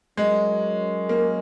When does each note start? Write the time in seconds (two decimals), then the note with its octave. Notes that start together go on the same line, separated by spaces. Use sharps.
0.17 F#3 G#3 C#4 A#4
1.09 A#3